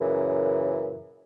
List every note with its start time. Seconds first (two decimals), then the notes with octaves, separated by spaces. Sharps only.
0.01 F#2 A#2 C#3 E3